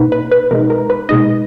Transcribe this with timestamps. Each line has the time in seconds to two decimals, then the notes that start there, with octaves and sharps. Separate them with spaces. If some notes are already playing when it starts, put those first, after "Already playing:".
Already playing: B2 A#3 D#4 B4
0.12 B4
0.32 B4
0.51 B2 G#3 D#4 A#4
0.70 A#4
0.90 B4
1.09 B2 G#3 D#4 D#5